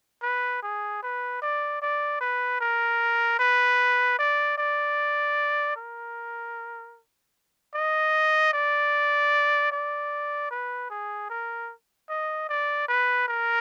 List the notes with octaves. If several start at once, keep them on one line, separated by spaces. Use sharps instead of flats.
B4
G#4
B4
D5
D5
B4
A#4
B4
D5
D5
A#4
D#5
D5
D5
B4
G#4
A#4
D#5
D5
B4
A#4